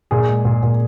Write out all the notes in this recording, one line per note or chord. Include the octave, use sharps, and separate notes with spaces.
A#2 G#4
G#3
A#2
A#2